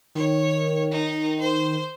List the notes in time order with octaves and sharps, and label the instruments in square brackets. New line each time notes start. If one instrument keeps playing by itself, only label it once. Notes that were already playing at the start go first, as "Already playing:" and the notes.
[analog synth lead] D#3 [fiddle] C#5
[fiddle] D#4
C5